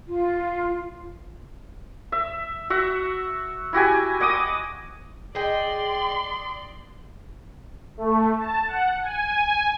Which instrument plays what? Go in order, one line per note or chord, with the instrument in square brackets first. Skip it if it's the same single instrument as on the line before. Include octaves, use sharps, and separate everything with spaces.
[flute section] F4
[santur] E5
F#4 E5 F#5
E4 F#4 G4 G#5
D#5 F#5 D6 D#6
[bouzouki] G#4 G5 [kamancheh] D5 C6 [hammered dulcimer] D#5
[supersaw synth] A3
A5
F#5
G#5